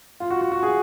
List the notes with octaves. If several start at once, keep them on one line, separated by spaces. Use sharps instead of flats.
F4
F#4
F#4
F#4
G#4